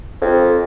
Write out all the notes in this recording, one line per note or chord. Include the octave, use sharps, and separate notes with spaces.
F2